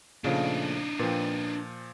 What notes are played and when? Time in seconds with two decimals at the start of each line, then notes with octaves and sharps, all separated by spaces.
0.24 A#2 C#3 F3 A3 D4 D#4
0.99 A#2 F3 B4 G5